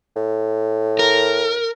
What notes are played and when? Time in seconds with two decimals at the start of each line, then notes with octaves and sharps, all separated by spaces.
0.16 A2
0.99 A#4